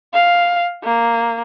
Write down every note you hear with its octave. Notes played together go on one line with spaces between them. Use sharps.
F5
A#3